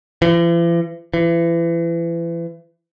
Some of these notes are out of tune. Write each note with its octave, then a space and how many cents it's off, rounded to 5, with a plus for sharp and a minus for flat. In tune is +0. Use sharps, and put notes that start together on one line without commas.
E3 +45
E3 +35